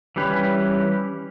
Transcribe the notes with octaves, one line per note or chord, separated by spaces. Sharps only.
E3 G3 C#4 G4 B4